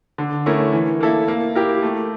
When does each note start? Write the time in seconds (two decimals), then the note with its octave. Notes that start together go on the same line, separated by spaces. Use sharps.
0.18 D3
0.46 A3 C#4 E4 A#4
0.73 E3
1.01 A#3 E4 A4 E5
1.28 A#3
1.55 E4 G4 A#4
1.83 A3